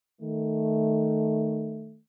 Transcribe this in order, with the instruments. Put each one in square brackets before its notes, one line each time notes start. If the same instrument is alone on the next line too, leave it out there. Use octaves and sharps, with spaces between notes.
[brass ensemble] D#3 A3